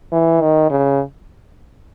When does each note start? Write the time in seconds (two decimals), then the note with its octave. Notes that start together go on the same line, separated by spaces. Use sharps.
0.12 E3
0.41 D#3
0.70 C#3